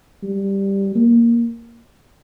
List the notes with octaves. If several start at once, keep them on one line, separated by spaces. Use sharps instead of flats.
G3
A#3